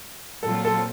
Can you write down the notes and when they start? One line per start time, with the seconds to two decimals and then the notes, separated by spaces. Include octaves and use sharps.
0.42 A#2 F#3 C4 F4 A4
0.65 A4